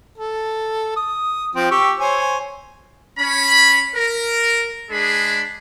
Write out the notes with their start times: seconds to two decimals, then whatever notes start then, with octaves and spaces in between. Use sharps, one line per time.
0.18 A4
0.96 D#6
1.55 F3 C4
1.71 G4 C#6 E6
2.00 C5 C#5 G#5
3.19 C#4 B5
3.96 A#4
4.91 G#3 D4 G#4 B5